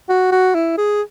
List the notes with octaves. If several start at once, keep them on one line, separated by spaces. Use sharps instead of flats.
F#4
F#4
E4
G#4